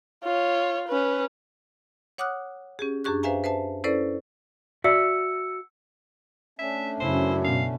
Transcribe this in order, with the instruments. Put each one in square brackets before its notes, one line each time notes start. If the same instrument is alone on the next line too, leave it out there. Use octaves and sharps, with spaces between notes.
[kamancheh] F4 C#5
C#4 B4
[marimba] C#5 F#5 D6 D#6 F6 F#6
C#4 G4 G#4
F#2 D4 G4 G#4 C#6 F#6
B4 C5 E5 F5 G#5 A#5
B4 C5 E5 A5
C#4 E4 A4 B4 C5 D5
[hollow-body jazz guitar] F#4 D5 E5 [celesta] E6 C#7
[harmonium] A3 C#4 D4 [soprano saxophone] E5
[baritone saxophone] F#2 [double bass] C#3 E4 [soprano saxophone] C5
[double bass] B2 [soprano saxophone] F5